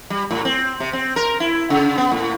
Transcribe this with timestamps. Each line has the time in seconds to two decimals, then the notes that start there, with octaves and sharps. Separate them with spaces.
0.10 G3
0.31 A2
0.45 C4
0.80 C3
0.93 C4
1.16 A#4
1.40 E4
1.70 C#3
1.98 B3
2.12 A2